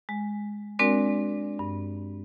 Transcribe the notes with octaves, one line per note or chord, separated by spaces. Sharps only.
G#3
G#3 C4 D4 F#4 A#4 D5
G2